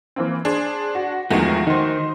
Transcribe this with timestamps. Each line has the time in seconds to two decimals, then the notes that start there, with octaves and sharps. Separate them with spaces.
0.16 E3 A#3 C4
0.45 D4 G#4 C5
0.95 F#4
1.30 E2 D#3 F3 G#3 A3 F#4
1.67 D#3 D#4 C5